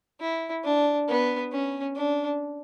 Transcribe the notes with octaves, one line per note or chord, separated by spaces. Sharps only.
E4
D4
B3
C#4
D4